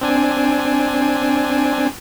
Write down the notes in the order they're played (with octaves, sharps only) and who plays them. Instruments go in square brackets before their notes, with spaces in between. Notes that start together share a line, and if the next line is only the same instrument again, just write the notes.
[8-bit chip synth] C4 D4 G#5